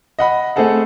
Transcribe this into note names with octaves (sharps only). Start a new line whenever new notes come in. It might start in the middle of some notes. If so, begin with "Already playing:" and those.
D#5 F#5 B5
A3 C4 G#4 A4 F#5